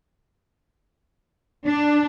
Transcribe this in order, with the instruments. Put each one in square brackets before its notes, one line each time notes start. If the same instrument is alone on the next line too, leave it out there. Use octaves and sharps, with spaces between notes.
[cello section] D4